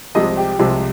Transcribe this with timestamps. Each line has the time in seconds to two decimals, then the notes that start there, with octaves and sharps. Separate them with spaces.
0.15 C2 C3 F3 G#3 D#5
0.37 G4
0.59 C2 C3 F3 G#3